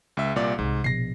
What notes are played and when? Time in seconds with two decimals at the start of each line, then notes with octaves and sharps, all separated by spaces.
0.17 C#2 E5
0.36 C2 A#2 D5
0.59 C2 G#2
0.84 A#1 B2 A#6 C7